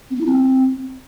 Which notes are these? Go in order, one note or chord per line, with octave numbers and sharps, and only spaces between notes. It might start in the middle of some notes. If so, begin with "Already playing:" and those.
C4
B3
E4
C4